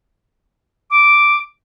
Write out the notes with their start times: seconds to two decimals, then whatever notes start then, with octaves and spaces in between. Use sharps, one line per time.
0.90 D6